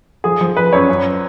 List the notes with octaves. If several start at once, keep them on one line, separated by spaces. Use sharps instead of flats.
F3 G#4
F3
F3 B4
F#2 C#5
F#2